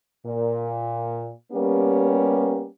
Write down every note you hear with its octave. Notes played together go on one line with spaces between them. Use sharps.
A#2
G3 A#3 B3 C#4 G4